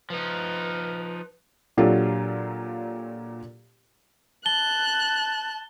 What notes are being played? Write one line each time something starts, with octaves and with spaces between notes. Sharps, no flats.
F3 D#4 B4
A#2 F#3 D4 F4 G4 A4
A5 F#6 G7